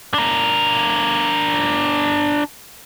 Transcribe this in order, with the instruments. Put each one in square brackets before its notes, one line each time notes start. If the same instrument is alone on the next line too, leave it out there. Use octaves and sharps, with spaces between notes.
[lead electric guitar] D4 A#4